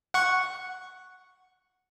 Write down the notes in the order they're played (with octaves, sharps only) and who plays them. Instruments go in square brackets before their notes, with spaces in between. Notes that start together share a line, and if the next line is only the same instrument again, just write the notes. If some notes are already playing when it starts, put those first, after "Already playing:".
[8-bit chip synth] F#5 C#6